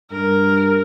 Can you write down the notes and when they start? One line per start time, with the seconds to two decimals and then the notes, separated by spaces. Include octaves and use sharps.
0.12 G2 A#4